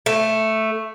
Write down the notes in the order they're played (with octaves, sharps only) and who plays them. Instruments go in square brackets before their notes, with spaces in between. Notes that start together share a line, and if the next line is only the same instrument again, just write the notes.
[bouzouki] A3